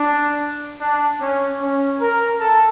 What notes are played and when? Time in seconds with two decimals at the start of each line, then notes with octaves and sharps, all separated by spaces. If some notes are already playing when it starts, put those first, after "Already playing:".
Already playing: D4
0.81 D4
1.21 C#4
1.61 C#4
2.00 A#4
2.40 A4